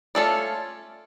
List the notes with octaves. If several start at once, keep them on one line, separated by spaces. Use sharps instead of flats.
A3 C#4 F4 A4 D5